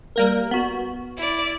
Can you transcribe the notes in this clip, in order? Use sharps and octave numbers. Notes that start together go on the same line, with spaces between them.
G3 A#3 A#4
B3 F#4
E4 D5